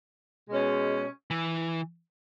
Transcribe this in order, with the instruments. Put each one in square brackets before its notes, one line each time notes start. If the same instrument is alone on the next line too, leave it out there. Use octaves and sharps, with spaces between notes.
[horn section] B2 G#3 C#4
[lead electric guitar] E3